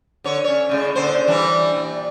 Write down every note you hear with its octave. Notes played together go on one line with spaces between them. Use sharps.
D3 C#5
C#4 C#5
A2 C#3 G#3
A#2 D3 C5
E3 G3 D4
A#2